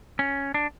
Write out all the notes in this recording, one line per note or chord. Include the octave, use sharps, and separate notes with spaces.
C#4
D4